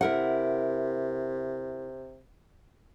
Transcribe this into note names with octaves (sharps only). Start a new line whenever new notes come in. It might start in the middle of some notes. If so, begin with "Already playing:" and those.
C3 E4 A#4 F#5